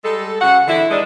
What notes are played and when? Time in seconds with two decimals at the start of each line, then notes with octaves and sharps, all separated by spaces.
0.04 G3 G#3 A4
0.41 C#3 F#4 F#5
0.68 B2 D3 E3 E4
0.90 D#3 E3 G#3 D4